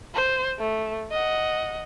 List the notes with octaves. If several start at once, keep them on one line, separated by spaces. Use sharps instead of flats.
C5
A3
D#5 F#5